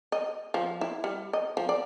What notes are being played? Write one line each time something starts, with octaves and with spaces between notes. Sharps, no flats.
D#5
F3
E4
G3
D#5
F3
D5